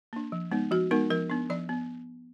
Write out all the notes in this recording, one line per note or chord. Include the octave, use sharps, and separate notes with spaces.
A#3 D4
F3
G#3 B3 D#4
F3 F#4
G#3 B3 D#4 A#4
F3 A#4
B3 D4
F3 D5
B3